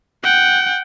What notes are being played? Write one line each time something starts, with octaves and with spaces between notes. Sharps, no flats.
F#5 G5